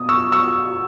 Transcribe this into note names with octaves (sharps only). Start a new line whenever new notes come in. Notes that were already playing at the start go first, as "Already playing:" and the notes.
Already playing: B2 D#6
C#6 E6
C#6 E6